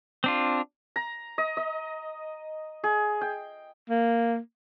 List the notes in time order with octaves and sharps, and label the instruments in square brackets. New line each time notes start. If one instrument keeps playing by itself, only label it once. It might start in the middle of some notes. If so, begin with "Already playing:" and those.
[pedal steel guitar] C4 D4 F4
[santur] A#5
D#5
D#5
G#4
G5
[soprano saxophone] A#3